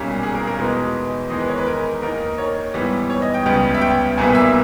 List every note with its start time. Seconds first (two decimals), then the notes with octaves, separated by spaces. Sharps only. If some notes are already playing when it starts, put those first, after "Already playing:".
Already playing: B1 A#2 G3 C#4
0.23 G#4
0.35 A#4
0.47 A#4
0.59 E2 B2 G#3 B3 D#4
1.30 E2 D#3 G#3 D#4 D#5
1.39 B4
1.48 C#5
1.58 B4
1.67 A#4
2.02 D#2 D#3 A#3 D#4 A#4
2.26 A#4
2.38 C#5
2.74 G#2 E3 G3 B3
3.10 C#5
3.22 D#5
3.34 G5
3.45 C#2 C#3 G3 B3 G5
3.74 E5
3.81 G5
4.17 B1 A#2 G3 B3 G#5
4.35 E5